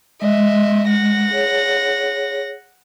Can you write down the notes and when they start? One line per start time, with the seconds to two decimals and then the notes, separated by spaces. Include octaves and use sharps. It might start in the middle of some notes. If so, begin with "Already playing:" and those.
0.22 G#3 D#5 E5
0.89 F#5 A#6
1.31 G#4 C#5